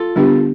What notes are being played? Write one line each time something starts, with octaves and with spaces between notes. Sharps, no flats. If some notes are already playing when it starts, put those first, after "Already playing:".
Already playing: F4 A4
D3 G3 B3 D4 G4